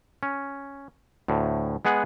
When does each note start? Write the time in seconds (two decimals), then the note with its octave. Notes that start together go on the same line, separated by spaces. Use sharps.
0.23 C#4
1.28 D2 A2
1.85 G#3 B3 G#4 F#5